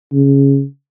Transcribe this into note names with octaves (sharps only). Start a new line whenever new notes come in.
C#3